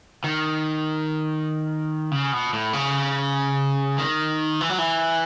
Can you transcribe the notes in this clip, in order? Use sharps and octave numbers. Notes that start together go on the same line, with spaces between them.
D#3
C#3
B2
A2
C#3
D#3
E3
F#3
E3